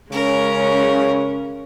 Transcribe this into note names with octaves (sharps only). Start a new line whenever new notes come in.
C#3 G#3 C#4 A#4